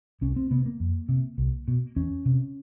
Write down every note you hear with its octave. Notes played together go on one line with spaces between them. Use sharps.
C2 C#4
C4
C3 B3
A#3
F2
C3
C2
B2
E2 C#4
C3